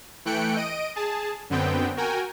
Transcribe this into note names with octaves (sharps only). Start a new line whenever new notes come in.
E3 A3 G5 F#6 C#7 D7
D#5 D7 D#7
G#4 A5
F#2 D3 B3 C4 G5
F#4 A#4 G5 G#5